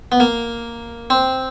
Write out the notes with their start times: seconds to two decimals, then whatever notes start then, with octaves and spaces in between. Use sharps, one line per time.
0.12 B3
0.20 A#3
1.10 C4